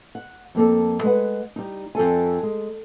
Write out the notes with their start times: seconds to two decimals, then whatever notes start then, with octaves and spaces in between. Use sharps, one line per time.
0.15 F#5
0.55 F2 A#3 A4
1.03 G#3 B4 F#5
1.56 G3 D#4
1.95 F2 G#2 A4 G#5
2.43 G#3